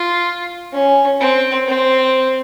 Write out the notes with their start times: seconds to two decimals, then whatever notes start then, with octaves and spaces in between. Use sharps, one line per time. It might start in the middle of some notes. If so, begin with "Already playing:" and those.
Already playing: F4
0.72 C#4
1.20 C4
1.67 C4